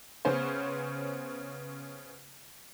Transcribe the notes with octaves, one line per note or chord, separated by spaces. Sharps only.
C#3 B3 C#4 C5